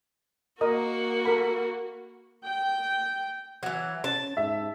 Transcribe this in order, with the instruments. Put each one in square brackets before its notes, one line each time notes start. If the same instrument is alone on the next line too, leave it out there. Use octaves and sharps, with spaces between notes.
[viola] A#3 F#4 [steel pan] A#4 D#5 D#6
[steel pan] A4 A#4 B5
[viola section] G5
[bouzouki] E3 F#3
[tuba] C#4 [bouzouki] A5
[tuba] G#2 [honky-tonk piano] E5